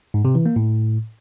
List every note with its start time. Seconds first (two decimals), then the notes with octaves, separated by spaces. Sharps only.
0.14 G#2
0.25 C3
0.35 E3
0.46 A#3
0.56 A2